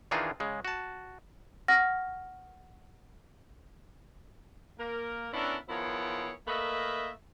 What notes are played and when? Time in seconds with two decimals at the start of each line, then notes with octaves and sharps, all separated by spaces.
0.11 D#3 E3 D4 D#4 F4 G#4
0.40 C#3 G#3
0.65 F#4 A5
1.68 F#5 C#6 F6 A#6
4.78 A#3 A#4
5.33 B3 C#4 D4 E4 A4 A#4
5.68 D#3 F3 B3 E4 G#4 C#5
6.47 A3 A#3 A#4 B4 D#5 E5